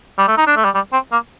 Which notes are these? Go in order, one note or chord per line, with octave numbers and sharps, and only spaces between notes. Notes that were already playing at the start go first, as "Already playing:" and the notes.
G3
A3
D#4
D4
A3
G3
G3
C4
A#3